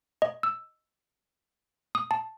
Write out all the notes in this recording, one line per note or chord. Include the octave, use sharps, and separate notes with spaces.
D#5
E6
D#6
A5